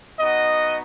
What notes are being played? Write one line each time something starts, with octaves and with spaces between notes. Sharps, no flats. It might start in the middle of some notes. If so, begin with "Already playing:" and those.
B3 D#4 F#4 D#5